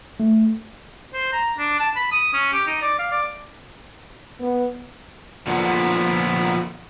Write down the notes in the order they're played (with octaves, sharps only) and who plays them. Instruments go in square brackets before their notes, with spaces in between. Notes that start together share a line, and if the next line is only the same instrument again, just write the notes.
[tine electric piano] A3
[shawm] C5
A#5
D4
A5
B5
D#6
C#4
G4
D#4
D5
F5
D5
[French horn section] B3
[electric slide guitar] A#2 D3 F3 B3